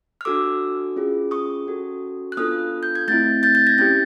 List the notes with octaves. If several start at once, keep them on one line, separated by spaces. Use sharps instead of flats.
F6
D4 F#4 A4 D6 E6
C#4 F4 G#4
C#6 D#6
C#4 F#4 A4
F#6
B3 D4 F4 A4 D#6 F6
G6
G#6
A3 C4 E4 G6 A6
G6 A6
G6 A6
G#6 A#6
C#4 E4 G4 G6 A6